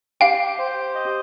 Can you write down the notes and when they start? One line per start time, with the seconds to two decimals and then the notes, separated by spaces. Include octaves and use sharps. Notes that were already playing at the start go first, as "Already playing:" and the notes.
0.21 G4 F5 G5
0.59 C5
0.95 D#5